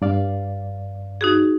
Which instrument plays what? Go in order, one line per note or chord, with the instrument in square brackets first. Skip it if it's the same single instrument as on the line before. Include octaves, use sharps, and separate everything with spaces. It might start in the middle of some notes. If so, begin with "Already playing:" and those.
[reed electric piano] G2 D5 F5
[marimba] D#4 F#4 G#4